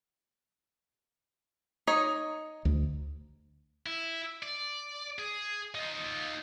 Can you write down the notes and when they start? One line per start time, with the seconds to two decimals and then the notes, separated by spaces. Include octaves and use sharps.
1.87 D#4 C#5 D#5
2.65 D2
3.86 E4
4.43 D5
5.19 G#4
5.75 D#4 F4